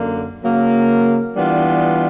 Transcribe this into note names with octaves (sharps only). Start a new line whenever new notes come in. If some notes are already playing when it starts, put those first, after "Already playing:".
Already playing: F#2 D3 A#3
C#3 F#3 A#3
E3 G3 B3 D4 F4